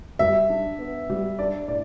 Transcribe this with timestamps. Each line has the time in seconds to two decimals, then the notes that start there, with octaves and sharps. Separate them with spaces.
0.19 G3 E5
0.50 D4
0.79 B3
1.10 G3
1.39 D4 D5
1.68 A2 D5